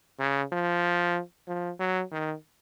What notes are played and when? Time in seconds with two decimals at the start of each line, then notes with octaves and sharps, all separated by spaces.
0.20 C#3
0.53 F3
1.48 F3
1.80 F#3
2.12 D#3